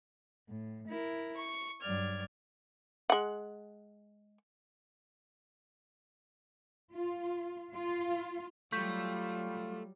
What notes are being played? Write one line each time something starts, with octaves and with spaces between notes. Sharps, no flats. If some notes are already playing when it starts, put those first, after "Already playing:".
A2
E4 A#4
C#6
G2 F#3 D5 F6 G#6
G#3 F#5
F4
F4
F#3 G3 A3 F4 C#6 G6 B6